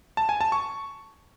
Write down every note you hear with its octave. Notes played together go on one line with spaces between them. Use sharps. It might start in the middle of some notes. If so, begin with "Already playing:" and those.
A5
G#5
A5
C#6